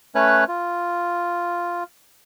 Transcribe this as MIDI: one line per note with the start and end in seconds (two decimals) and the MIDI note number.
0.15 0.44 57
0.15 0.44 61
0.15 0.44 71
0.15 0.44 73
0.15 0.44 90
0.48 1.83 65